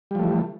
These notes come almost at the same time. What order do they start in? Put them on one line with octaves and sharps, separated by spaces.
G3 F3 A3 E3